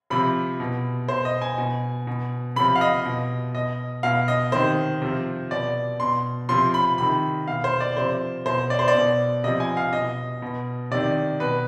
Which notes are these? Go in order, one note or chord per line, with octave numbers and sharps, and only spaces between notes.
C3 F3 B5
B2
B2 C5
D#5
G#5
B2
B2
C3 F3 B5
F5
D#5
B2
B2 D#5
B2 F5
D#5
C3 D#3 C5
C3 F3
B2 D5
B2 C6
C3 F3 C6
B5
C3 D#3 B5
B2 F5
C5
D5
C3 F3 C5
B2 C5
D5
C5
D5
B2
C3 F3 D#5
G#5
F5
B2 D#5
B2
C3 D#3 D5
B2 B4